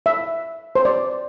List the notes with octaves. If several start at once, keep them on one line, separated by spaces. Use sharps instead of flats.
E5
C5
D5